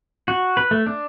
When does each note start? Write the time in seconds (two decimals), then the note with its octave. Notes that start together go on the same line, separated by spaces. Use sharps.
0.28 F#4
0.57 B4
0.71 A3
0.87 D4